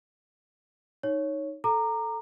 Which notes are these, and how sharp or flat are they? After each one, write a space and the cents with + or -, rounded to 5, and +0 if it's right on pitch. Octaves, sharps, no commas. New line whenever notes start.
D#4 +0 C#5 +0
A4 +0 A#5 -10 D6 +30